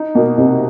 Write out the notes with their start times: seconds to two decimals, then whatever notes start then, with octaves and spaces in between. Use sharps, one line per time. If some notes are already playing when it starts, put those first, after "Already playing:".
Already playing: D#4
0.15 B2 A#3
0.38 C3 D#4